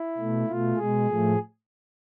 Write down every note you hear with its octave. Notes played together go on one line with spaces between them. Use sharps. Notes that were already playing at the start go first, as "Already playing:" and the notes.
Already playing: E4
B2 A3
B2 A3 F4
B2 G#3 G#4
A2 F3 A3